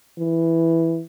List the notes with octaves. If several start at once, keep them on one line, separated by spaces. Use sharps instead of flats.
E3